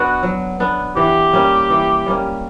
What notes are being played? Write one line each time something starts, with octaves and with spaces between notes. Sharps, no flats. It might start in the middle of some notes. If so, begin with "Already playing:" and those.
Already playing: B3 D4 F#4
F#3
B3 D4
E3 G4
G3 A#3 C#4
E3
G3 A#3 C#4